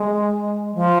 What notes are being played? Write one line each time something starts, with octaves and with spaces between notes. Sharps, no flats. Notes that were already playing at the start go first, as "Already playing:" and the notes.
Already playing: G#3
F3